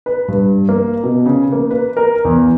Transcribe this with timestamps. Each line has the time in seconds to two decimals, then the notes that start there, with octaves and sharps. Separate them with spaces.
0.06 B4
0.28 G2
0.69 A#3
1.03 B2
1.26 C#3
1.52 A#3
1.71 B4
1.97 A#4
2.25 E2